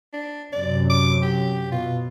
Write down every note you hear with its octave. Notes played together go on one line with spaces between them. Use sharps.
D4
F#2 C3 D5
D6
G4
B2 F4